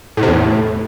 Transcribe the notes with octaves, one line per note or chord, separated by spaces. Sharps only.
A2
C3
E2
A2